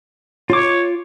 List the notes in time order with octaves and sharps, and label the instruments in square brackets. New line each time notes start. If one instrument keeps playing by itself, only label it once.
[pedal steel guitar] F4 D6 [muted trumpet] C#5